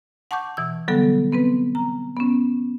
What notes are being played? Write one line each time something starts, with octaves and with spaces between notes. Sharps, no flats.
F#5 A5 C#6 D6 G6
B2 E3 E6
D3 F#3 G3 B3 A4
B3 C4 B4
A#5
B3 C#4